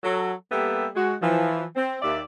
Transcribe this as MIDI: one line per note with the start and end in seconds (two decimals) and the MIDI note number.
0.04 0.33 54
0.04 0.33 69
0.51 0.87 55
0.51 0.87 58
0.51 0.87 59
0.51 0.87 67
0.51 0.87 69
0.51 0.87 76
0.96 1.15 56
0.96 1.15 66
1.22 1.65 52
1.22 1.65 53
1.76 1.98 60
2.02 2.20 39
2.02 2.20 74
2.02 2.20 76